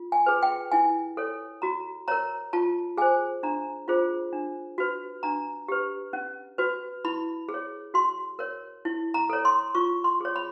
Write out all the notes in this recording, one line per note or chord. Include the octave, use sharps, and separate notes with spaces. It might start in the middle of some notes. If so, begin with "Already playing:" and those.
Already playing: F4
G#5
G#4 B4
G5
E4 G#5
A4 C#5
F#4 A#5
A#4 C#5 A#5
F4 A5
G#4 C5 G#5
D4 A#5
F4 G#4 C5
D4
F#4 B4
D4 A#5
G4 B4
C#4
F#4 B4
E4 B5
G#4
C#5
F#4 C6
A#4 C#5
E4
A#5
A4 C#5
C6
F4 C#6
C6
G#4 C#5
B5